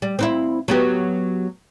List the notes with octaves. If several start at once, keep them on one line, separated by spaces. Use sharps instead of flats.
G3
C4 D#4 E4
F#3 B3 G4